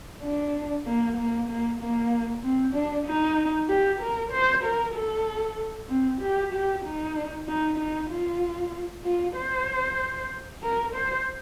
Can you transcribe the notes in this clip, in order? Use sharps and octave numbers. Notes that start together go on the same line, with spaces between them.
D4
A#3
A#3
A#3
A#3
C4
D4
D#4
G4
A#4
C5
A#4
A4
C4
G4
G4
D#4
D#4
D#4
F4
F4
C5
A#4
C5